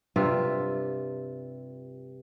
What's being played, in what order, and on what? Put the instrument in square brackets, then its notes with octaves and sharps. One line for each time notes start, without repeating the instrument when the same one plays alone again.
[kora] G2 C3 F4 E5